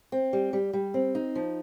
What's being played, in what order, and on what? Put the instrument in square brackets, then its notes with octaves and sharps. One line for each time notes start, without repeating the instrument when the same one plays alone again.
[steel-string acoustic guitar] C4
G3
G3
G3
C4
D#4
F3